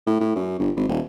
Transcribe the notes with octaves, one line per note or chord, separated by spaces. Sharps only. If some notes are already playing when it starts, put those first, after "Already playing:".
A2
A2
F#2
G1
G#1
D#1